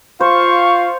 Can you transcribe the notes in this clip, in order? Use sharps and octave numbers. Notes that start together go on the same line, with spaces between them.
F4 C5 F5 C#6